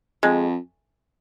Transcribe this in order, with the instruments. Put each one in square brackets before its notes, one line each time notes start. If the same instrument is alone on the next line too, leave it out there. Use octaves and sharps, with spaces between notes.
[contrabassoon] F2 [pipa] G#3